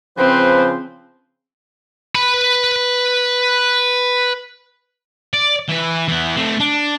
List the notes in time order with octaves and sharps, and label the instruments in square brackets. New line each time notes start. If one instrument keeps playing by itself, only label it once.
[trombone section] C#3 F3 [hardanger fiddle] C4 [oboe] B4 [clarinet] C5
[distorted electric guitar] B4 B5
D5
E3 B4
E3 B3
A3 C4
D4